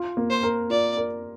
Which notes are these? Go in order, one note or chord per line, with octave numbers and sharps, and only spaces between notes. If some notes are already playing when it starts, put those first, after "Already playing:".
Already playing: F4
A#3
C5
A#4
F4 D5
A#4